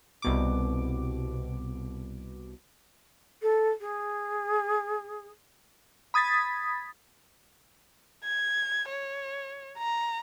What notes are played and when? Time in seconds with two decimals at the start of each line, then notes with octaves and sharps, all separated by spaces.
0.22 C2 B2 D6
3.42 A4
3.81 G#4
6.14 B5 D#6 G#6 A6 B6
8.24 G#6
8.89 C#5
9.78 A#5